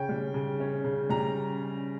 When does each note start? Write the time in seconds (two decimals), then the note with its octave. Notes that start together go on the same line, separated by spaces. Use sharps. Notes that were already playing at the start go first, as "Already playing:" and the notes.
Already playing: C#3 C#4 G5
0.09 G3
0.34 C#3
0.60 C#4
0.84 C#3
1.10 G3 A#5